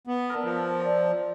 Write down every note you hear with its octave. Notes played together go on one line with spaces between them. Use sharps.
B3
A#4 E5 A5
F3
D5